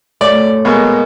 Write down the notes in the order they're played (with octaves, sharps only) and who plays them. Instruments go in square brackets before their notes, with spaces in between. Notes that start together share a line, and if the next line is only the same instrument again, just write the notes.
[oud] F#2 A3 C#5 [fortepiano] D5
[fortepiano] B2 G#3 A#3